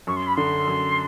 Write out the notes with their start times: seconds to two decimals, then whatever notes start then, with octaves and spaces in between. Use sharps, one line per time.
0.07 F#2 C#6
0.16 C6
0.27 B5
0.36 D3 C6
0.68 F#2